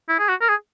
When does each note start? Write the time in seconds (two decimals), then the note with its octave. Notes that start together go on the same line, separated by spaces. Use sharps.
0.09 E4
0.19 G#4
0.29 F#4
0.41 A#4
0.49 G#4